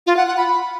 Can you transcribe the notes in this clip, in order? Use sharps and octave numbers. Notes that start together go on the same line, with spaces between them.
F4
F#5
F#5
B5